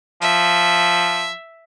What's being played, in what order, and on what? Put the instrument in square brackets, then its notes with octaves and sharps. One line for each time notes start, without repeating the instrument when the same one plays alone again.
[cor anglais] F3 [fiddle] E5